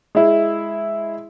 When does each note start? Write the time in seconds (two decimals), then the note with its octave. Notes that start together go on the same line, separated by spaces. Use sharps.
0.15 G#3 E4